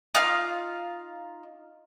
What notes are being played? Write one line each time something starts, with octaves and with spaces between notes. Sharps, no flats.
D#4 F4 F5 F6